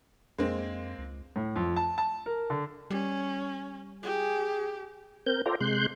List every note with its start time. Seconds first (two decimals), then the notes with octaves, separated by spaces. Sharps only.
0.38 F2 G#3 A#3 C4
0.98 C#2
1.36 A2
1.56 F2
1.76 A5
1.98 A5
2.26 A#4
2.50 D3
2.90 G3 C#4
4.03 G4 G#4
5.26 C4 A#4 G6
5.46 F4 A4 C5 D5 G5 A#5
5.60 C3 G#3 C6 F#6 G6